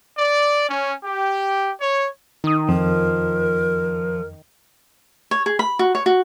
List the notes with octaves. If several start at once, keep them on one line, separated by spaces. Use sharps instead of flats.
D5
C#4
G4
C#5
D#3 D#4 D#6
F2 F3 A#4
C#5
G#4
B5
F#4
C#5
F#4